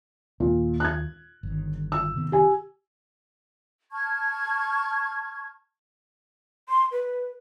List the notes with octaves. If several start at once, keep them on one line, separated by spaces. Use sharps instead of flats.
D#2 A#2
F#6 G#6
G1 D#3
E6
C3 D#3 B3
G4 G#5
A5 C#6 F6 G#6
C6
B4